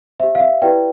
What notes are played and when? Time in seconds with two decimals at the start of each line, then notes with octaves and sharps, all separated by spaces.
0.20 G4 C5 E5
0.35 F5
0.40 E5
0.62 E4 G4 B4 D5 G5